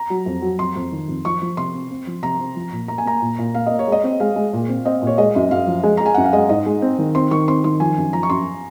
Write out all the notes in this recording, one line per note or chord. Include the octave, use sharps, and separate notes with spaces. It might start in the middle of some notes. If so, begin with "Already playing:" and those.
Already playing: A#5
F#3
F2
F#3
F2 C6
F2
D#3
F2
F3 C#6
F3
C3 C6
C4
C4
F3
C3 A#5
C4
F3
A#2
A#3 A#5
G#5
A#3 A#5
A#2
A#2
A#3 F5
A#3 D#5
C#5
G#3
D#5
C4
G#3 F5
G#3
A#2
C4
C4 D#5
A#2
C#5
G#3 D#5
F#2
F#2 F5
F3
G#3
G#3 A#5
G#5
F#2 F#5
F5
G#3 D#5
G#2 D#5
G#3
C4
D#3
C4 C6
D#3 C#6
C4 C6
D#3 C6
F3 G#5
F#2
F3 A#5
C#6
F#2 C6